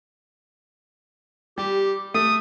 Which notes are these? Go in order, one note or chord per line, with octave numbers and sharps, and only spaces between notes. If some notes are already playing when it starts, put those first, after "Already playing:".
G3 G4
A3 D#6